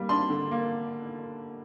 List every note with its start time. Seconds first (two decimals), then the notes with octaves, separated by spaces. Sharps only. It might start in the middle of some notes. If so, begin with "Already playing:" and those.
Already playing: G3 A#3
0.09 D4 C6
0.30 D3
0.51 A#3